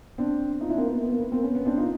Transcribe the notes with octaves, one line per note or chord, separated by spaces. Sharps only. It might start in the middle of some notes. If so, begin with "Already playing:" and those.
C4 D4
D#4 F4
D4 E4
A#3 C4
B3
A#3
B3
A#3
B3
A#3 C4
B3 C#4
B3 C#4
C4 D4
D#4 F4